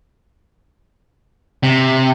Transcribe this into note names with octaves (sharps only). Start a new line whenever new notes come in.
C3